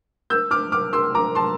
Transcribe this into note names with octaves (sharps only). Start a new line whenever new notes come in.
E6 G6
D6 F6
D6 F6
C6 E6
A#5 D6
A5 C6